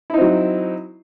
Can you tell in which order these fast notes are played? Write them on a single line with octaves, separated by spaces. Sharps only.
E4 D#4 C4 F#3